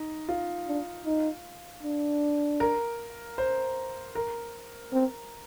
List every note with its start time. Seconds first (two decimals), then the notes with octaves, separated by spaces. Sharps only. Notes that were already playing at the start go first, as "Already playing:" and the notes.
Already playing: D#4
0.29 F4
0.68 D4
1.06 D#4
1.83 D4
2.60 A#4
3.38 C5
4.15 A#4
4.93 C4